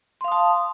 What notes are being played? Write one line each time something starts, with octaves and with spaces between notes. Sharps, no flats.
F5 A5 C6 D#6